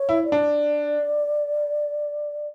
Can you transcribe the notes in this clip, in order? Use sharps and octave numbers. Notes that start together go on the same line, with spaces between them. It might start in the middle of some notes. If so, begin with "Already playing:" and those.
Already playing: C#5
E4
D5
D4